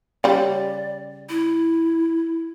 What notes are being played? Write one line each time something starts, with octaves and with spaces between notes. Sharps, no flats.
C#3 G3 D5
E4